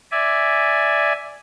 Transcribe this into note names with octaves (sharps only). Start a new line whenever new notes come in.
D5 E5 G#5